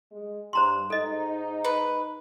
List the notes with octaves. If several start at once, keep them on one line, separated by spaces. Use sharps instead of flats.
G#3
G2 C5 A#5 C6
G#2 D#4 A4 D#5
B4